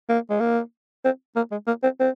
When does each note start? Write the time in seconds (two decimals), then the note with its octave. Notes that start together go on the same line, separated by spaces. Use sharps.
0.09 A#3
0.30 G#3
0.40 A#3
1.05 C4
1.36 A#3
1.51 G#3
1.67 A#3
1.83 C4
2.00 C4